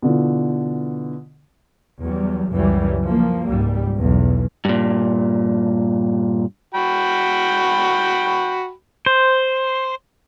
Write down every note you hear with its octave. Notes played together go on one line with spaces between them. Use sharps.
B2 D3 E3 F4
E2 F#3 G3
C#2 F#2 C#3 E3 F#3 G3
F3 A#3
C#2 G#2 G3
B1 E2
G2 A#2
F#4 G5 B5
C5